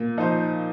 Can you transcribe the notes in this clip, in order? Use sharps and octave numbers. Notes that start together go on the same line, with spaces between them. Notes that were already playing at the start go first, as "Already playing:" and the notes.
Already playing: A#2
F3 D#4 C5